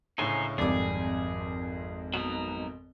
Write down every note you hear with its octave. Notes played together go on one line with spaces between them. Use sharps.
C#2 A2 D3 D#4 C5 G#5
G#1 F2 G3 G#4 A4 D5 D6
B2 F#3 B3 D#4